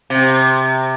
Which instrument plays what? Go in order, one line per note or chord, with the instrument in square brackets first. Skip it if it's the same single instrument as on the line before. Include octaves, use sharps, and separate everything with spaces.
[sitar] C3